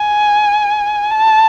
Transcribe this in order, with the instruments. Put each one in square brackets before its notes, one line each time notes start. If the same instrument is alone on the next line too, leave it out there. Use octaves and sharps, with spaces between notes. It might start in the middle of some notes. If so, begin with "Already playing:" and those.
Already playing: [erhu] G#5
A5